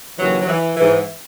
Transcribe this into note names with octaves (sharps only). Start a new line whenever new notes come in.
D#2 C#3 E3 F#3
F#3
E3
E3
G#2